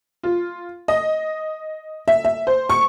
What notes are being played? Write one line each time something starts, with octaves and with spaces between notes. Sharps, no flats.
F4
D#5
E5
E5
C5
C#6